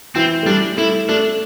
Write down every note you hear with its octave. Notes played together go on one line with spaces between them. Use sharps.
E3 C4
A3
G3 D4
A3 E4
A3 D4